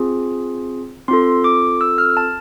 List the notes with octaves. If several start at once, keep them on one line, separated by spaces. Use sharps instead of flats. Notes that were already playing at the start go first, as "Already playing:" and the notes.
Already playing: C4 F4 G#4
C4 F4 A4 C6
D6
E6
F6
A5